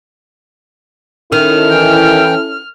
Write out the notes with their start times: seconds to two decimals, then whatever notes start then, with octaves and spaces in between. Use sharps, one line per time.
1.32 D#3 C#4 E4 A4 F6
1.70 E3 G5